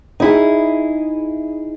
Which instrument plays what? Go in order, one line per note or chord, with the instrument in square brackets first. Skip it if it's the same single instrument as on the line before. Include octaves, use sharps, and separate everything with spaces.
[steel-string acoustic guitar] D#4 E4 G#4